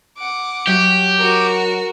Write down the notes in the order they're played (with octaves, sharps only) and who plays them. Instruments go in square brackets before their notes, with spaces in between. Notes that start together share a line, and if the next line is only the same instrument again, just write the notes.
[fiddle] F#5 D6
[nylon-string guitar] F#3 E5 [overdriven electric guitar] G4
[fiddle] F#4 A#4